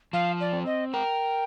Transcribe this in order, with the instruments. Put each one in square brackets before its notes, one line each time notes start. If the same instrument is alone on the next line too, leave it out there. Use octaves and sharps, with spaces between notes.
[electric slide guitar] F3 [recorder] F5
[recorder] D5
[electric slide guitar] C4
[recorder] D#5
[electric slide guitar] A#4 [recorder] G5